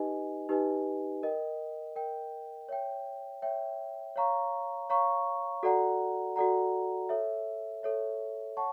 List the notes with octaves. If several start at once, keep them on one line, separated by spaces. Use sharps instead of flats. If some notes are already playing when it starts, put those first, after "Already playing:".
Already playing: D#4 G4 B4 D#5 G#5
D#4 G4 B4 D#5 G#5
A#4 D#5 G5
A#4 D#5 G5
C#5 E5 G5
C#5 E5 G5
C#5 F5 A#5 C#6
C#5 F5 A#5 C#6
F#4 A4 D5 F#5 A#5
F#4 A4 D5 F#5 A#5
A4 C#5 E5
A4 C#5 E5
C#5 F#5 A5 C#6